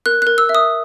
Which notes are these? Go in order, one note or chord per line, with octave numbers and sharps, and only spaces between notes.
A#4 F#6
A#4 F#6
E6
E5
D#6